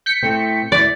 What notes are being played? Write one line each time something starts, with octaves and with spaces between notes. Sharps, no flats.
G6 B6 C#7
A2 A3 C4
D2 G#2 E4 D5